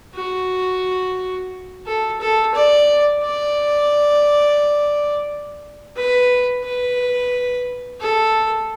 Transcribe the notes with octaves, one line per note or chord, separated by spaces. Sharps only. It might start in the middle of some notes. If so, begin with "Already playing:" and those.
F#4
A4
A4
D5
D5
B4
B4
A4